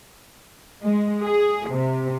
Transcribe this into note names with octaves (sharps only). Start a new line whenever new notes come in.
G#3
G#4
C3